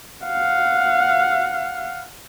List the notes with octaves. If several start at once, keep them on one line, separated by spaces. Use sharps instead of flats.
F5 F#5